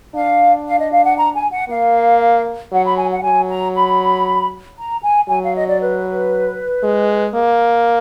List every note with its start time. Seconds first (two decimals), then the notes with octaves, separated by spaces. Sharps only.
0.15 D4 F5
0.67 F5
0.79 D#5
0.92 F5
1.04 F#5
1.17 A#5
1.35 G#5
1.52 F#5
1.69 A#3 F5
2.72 F#3 F#5
2.85 B5
2.97 G#5
3.10 F#5
3.23 F#3 G#5
3.49 A#5
3.74 B5
4.78 A#5
5.03 G#5
5.29 F#3 G#5
5.42 F5
5.55 D#5
5.67 D5
5.81 B4
6.83 G#3
7.35 A#3